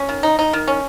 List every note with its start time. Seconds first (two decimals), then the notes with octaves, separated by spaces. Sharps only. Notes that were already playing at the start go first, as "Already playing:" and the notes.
Already playing: C#4
0.09 D#3
0.23 D#4
0.39 D#4
0.53 D#3
0.68 C#4